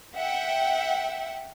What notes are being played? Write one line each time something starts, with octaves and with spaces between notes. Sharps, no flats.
E5 F#5 G5